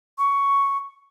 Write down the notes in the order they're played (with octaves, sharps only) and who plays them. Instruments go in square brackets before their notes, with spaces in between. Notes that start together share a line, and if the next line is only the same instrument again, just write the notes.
[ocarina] C#6